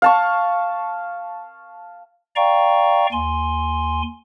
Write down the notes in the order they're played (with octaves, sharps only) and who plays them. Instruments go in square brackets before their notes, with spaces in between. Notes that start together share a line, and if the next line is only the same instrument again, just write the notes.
[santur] F5 A5 C#6
[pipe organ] D5 F5 G5 A#5 C#6
D#2 G#5 C6